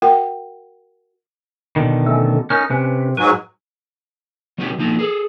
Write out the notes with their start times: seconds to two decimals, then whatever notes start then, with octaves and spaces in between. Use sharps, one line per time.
0.02 F#4 A#4 F#5 G5
1.76 B2 D3 D#3
2.06 A3 C#4 A4
2.50 C#4 D#4 A#4 F6
2.70 C3 C#4 B4
3.17 G#2 F#3 B4 G#5 C#6
4.58 F#3 C4 C#4 D#4 F#4 G4
4.78 F3 A#3 D#4 F#4
4.99 G#4 A4